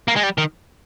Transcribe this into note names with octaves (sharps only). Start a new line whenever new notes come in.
A#3
G#3
G3
D#3